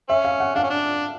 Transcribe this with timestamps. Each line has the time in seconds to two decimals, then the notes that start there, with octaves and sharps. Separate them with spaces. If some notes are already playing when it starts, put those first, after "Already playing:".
0.09 C#4 E5
0.24 F5
0.40 F#5
0.55 D4 F5
0.63 C#4
0.70 D4